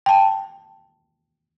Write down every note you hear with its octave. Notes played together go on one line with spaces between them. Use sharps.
G5 A5